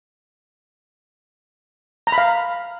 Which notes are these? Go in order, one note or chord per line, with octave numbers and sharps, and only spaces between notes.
A#5
B5
F5